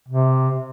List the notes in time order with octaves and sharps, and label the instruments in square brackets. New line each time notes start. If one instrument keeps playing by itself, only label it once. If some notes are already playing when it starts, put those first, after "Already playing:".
[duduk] C3